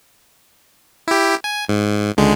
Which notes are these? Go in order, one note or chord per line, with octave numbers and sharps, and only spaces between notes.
E4 G4
G#5
G#2
C#2 D3 G#3